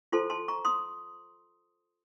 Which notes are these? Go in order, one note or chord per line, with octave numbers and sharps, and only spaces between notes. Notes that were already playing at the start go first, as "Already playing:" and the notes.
F4 A4 C5 A5 C6
A5 C6
A#5 C#6
C6 D#6